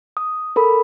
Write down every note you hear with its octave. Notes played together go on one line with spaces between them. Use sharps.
D#6
A4 A#4 B5